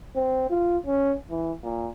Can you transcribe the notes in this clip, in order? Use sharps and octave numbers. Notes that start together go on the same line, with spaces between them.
C4
F4
C#4
E3
A#2